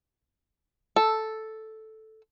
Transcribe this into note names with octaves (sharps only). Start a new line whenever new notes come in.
A4